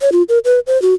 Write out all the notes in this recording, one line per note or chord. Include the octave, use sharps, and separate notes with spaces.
C#5
F4
A#4
B4
C5
F#4